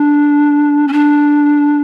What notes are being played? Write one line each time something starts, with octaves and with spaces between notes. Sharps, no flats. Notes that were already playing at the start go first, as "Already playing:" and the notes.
Already playing: D4
C#4
D4